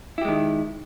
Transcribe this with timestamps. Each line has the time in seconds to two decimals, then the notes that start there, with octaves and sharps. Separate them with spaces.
0.18 E4
0.21 G4
0.25 G#3
0.28 D#3